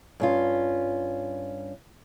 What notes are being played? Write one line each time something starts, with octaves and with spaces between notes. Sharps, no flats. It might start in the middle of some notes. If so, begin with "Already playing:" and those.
G2 C#4 F4